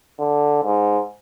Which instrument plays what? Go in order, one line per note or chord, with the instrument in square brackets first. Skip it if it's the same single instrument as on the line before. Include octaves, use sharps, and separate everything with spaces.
[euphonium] D3
G#2